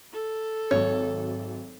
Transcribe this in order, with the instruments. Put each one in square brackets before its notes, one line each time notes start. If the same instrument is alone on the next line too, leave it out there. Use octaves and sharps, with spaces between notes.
[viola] A4
[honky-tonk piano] G#1 F#3 [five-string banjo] C#5